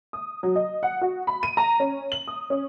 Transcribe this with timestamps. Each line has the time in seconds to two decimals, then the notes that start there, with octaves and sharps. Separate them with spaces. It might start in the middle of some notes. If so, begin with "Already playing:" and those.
0.13 D#6
0.43 F#3
0.55 D#5
0.83 F#5
1.01 F#4
1.27 B5
1.43 D#7
1.57 A#5
1.80 C#4
2.12 F#7
2.28 D#6
2.50 C#4